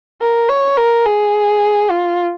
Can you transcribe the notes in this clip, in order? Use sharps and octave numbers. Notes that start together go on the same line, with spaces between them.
A#4
C#5
A#4
G#4
F4